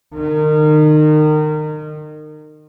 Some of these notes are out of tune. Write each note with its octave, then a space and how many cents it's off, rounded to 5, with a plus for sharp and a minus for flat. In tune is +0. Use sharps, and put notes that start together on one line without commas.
D#3 -30